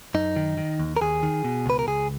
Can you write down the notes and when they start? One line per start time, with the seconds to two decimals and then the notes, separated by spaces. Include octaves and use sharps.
0.14 F#2 D#4
0.36 D#3
0.58 D#3
0.79 D#2
0.97 A#4
1.01 D#2 G#4
1.23 D#3
1.44 B2
1.66 C#2 B4
1.79 A#4
1.87 C#2 G#4